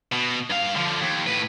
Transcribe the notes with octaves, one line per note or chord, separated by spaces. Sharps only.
B2
G2 F5
D3 F3
D#2
A2 B4